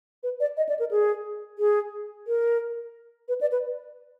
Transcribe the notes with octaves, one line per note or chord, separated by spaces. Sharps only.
B4
D5
D#5
D5
A#4
G#4
G#4
A#4
B4
D5
B4